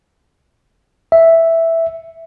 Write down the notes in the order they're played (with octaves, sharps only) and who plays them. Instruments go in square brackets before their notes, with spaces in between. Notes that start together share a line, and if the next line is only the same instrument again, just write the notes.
[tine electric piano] E5